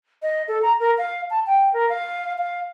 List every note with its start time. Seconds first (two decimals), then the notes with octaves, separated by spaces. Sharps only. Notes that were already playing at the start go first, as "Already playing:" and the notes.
0.22 D#5
0.48 A4
0.62 A#5
0.80 A#4
0.98 F5
1.30 A5
1.46 G5
1.73 A#4
1.89 F5
2.38 F5